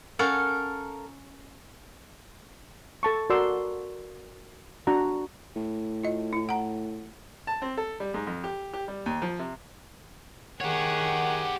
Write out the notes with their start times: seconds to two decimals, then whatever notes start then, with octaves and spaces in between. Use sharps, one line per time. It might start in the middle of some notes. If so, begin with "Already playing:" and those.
0.19 C#4 A4 A#4 C#5 F5 F#5
3.03 A4 A5 C#6
3.30 F#4 A#4 D5 C6 E6
4.87 D4 F#4 A#5
5.56 A2
6.04 F4 D#5
6.33 E4
6.49 F#5 A#5
7.47 A5
7.62 C4
7.77 A4
8.00 G3
8.14 G#2
8.27 F2
8.44 G4
8.73 G4
8.88 G3
9.06 D#2
9.22 F3
9.39 C3
10.61 D#3 G4 G#4 C#5 F#5